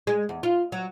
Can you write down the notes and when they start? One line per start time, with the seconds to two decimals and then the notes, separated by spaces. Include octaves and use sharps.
0.07 G#3
0.29 E2
0.43 F4
0.72 F#3